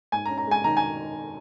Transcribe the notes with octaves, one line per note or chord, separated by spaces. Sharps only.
G#2 G#5
A#5
C#4
A#5
G#3 G#5
D#3 A#5
G#5